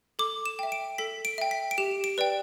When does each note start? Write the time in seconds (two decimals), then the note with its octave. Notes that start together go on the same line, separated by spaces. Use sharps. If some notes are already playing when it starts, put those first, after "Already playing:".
0.19 A4 D6
0.46 E7
0.59 E5 G5
0.72 D7
0.98 A4 B6
1.25 D7
1.38 E5 G5
1.51 B6
1.71 D7
1.78 G4 E7
2.04 D7
2.18 B4 D5 G5